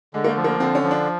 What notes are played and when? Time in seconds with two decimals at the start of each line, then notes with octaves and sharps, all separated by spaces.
0.14 D3 G#3
0.24 A#3
0.29 A3
0.36 F3
0.44 A#3
0.60 D3 C4
0.75 C#4
0.83 F3
0.91 D4